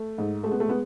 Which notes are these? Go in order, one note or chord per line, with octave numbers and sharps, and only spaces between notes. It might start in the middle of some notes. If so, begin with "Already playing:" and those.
Already playing: A3
G#2
G#3 A3
B3
A3
G#3 B3